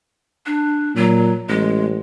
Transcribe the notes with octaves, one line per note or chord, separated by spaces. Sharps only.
D4
A#2 F#3
A1 G#3